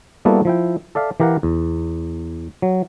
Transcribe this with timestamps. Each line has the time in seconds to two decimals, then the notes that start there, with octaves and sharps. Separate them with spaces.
0.25 G3 A#3 B3 E4 F#4 A4
0.45 F3 E4 G5
0.95 A4 D5 E5 F5
1.20 E3 G4 A#4 F5 F#5
1.43 E2
2.62 F#3